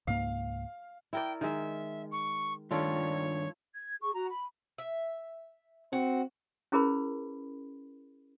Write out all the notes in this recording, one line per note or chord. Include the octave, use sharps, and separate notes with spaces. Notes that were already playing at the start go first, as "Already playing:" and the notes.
C#2 G#2 A#3 F5
E4 A#4 D5 G5
D#3 G#3 E5
C#6
G2 D#3 D4 F4 A4 C#5 D5
G#6
G#4 C#6
F#4 A#5
B5
E5
C4 F#4
C#4 E4 G#4 A#4 B4 B5